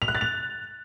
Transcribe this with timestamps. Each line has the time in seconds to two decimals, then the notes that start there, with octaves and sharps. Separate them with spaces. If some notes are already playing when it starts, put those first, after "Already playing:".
0.02 F7
0.08 F#6
0.15 A6
0.21 F7